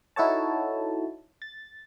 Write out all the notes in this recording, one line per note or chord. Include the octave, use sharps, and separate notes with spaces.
D#4 E4 F#4 A4 C#5 A5
A6